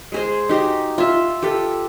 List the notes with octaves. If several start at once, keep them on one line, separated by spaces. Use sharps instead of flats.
G#3 G#4 C5
D#4 F#4 G4
F4 E5
G4 A4 B4